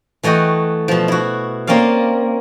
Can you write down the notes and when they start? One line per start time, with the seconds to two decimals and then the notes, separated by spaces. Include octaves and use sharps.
0.23 E3 A3 F#4 D#5 G5
0.88 B2 F3
1.08 E4 F#4
1.67 A#3 C4 C#4 D5 F5